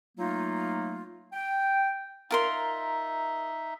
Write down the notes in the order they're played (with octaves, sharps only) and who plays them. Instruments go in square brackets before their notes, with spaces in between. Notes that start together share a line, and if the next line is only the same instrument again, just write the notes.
[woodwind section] F#3 A3 A#3 D#4 F4
G5
[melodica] D#4 E5 [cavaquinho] F4 A#4 C6